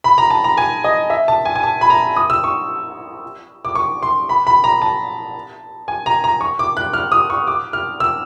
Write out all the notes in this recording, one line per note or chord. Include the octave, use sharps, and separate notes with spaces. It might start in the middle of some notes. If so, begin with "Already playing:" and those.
B5
A#5
A5
A#5
G#5
D#5
E5
A5
G#5
G#5
A5
B5
A#5
D#6
E6
C#6
D6
C#6
C6
B5
B5
A#5
A5
G#5
A#5
A#5
C#6
D6
F#6
F6
D#6
C#6
D6
F6
E6